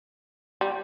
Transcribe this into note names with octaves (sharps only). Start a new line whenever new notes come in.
G3